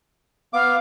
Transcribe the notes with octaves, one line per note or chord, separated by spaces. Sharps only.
B3 F5 D6